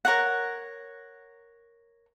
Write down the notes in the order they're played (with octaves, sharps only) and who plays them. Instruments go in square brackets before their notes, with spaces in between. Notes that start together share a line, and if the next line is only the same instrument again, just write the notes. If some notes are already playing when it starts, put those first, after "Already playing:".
[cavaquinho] A#4 C#5 F#5